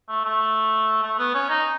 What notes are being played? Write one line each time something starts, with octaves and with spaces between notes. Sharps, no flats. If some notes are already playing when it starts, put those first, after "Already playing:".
A3
A3
A3
B3
C#4
D#4